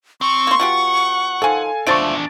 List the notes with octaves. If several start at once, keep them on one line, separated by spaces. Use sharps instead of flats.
C4 C#6
A#3 C6
B2 F4 G4 F#5
D#3 F3 A4 F5 G#5
E2 D3 F3 A3 D4 C#6 A6 D7